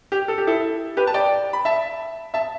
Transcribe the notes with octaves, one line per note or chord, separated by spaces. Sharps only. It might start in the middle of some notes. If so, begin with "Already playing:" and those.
G4
A4
G4
E4 A4
G4 B4
A5
D5 G5
B5
E5 A5
E5 A5